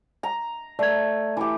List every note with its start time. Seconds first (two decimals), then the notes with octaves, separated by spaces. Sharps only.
0.23 A#5
0.79 A3 D5 G#6
1.37 E3 G4